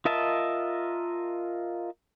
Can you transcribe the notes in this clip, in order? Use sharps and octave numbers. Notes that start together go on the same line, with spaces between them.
F4 A#4 D#5 E5 A5